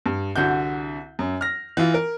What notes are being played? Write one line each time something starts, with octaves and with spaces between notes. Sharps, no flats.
G2
C2 D3 F#4 F#5 G6
F#2
F6 A#6
E3 F4
A#4